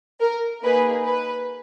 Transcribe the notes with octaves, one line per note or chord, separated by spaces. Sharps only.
A#4
A#3 D#4 G#4 B4
B4